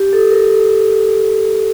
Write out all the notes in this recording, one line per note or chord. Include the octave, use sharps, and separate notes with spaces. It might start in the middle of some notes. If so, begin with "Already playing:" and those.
Already playing: G4
A4
A#4
A4